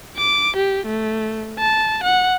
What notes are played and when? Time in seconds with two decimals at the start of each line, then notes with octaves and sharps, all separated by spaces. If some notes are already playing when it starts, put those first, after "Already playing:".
0.17 D6
0.56 G4
0.86 A3
1.59 A5
2.03 F#5